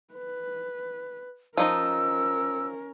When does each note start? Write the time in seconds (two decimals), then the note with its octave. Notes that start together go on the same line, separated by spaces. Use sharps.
0.14 B4
1.57 F3 C#4 D#4 A#4 D#5 E6